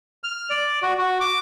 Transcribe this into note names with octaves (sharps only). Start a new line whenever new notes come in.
F6
D5
F#4
F#4
D6